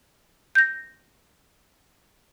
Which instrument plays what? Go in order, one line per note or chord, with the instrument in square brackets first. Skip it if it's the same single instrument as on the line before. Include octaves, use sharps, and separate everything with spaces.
[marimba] G6 A#6